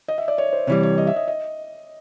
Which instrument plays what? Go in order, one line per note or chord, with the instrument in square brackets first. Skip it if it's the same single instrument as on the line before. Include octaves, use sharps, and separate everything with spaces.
[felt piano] D#5
E5
D5
C#5
C5
[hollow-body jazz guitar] C3 E3 G3 [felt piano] C#5
[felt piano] C#5
D#5
E5
D#5
D#5